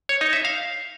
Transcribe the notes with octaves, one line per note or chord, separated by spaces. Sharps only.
C#5
D#4
E5
F5